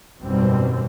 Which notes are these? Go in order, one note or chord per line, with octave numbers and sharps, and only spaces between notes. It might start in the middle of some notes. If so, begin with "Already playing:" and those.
G#1 F#2 B2 G3 C4